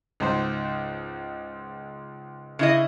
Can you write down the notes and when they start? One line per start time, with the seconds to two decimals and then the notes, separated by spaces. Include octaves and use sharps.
0.20 C#2 G#2 C5
2.59 C#3 E4 D#5